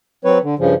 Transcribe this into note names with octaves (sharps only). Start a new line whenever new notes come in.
F#3 C4 B4 C#5
D3
G2 C#3 F3